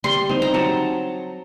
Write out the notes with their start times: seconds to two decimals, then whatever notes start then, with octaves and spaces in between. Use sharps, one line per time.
0.04 G3 C6
0.29 C4 D#4
0.42 A#5
0.54 F#3 A5